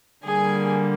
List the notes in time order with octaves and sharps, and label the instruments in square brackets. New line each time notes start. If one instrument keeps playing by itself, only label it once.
[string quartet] D3 G3 A#3 G#4 G#5